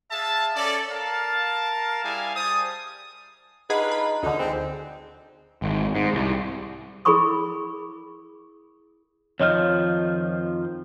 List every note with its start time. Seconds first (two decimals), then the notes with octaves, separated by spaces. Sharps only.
0.11 G#4 E5 F5 A5
0.56 C#4 A4 D5
0.91 A#4 F5 A5
2.04 G3 E4 G#4 A#4 F5 G#5
2.36 G3 C5 G#5 A5 D#6
3.70 D4 D#4 F4 G#4 B4 F#5 B5
3.92 B5
4.23 D2 B2 D3 D#4
4.39 F3 G#3 C4
5.62 G#1
5.95 G#2
6.14 C2
7.05 E4 G#4 A#4 B5 C#6 D#6
9.40 F2 D#3 F3 C#5 D#5 F6